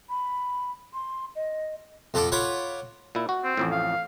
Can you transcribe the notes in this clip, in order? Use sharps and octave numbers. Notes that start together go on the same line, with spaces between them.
B5
C6
D#5
F2 F4 A4 F#5 D6
F4 C#5 F#5 B5 D6
A#2 E4
F#4
C4
A1 F2 A2
F5